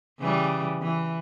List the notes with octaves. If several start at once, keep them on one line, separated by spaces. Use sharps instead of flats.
C#3 E3 G3
E3